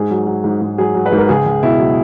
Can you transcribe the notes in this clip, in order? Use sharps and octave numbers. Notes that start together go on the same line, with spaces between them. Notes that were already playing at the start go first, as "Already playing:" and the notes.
Already playing: G#2 G#4
F#3
F#3
G#2
G#2
F#3 G#4
F#3
B4
G#2 A#4
C#2 G#4
C#2
B2 E4
F#3